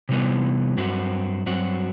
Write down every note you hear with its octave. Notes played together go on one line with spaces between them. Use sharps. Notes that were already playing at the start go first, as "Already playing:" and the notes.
C3 E3 G3 B3
G2 F#3 C4 F#4
G2 F#3 C4 F#4